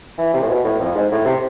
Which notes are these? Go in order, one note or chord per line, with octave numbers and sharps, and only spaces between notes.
E3
C3
A2
B2
A2
F2
G#2
A2
C3